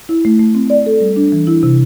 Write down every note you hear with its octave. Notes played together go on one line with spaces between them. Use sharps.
E4
A3
A3
C4
D5
A4
G3
D4
E3
E4
C3